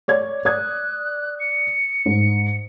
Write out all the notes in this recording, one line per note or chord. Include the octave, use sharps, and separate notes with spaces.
C#5 D5 G#6
D5 D#6 F#6 G#6
C#7
G#2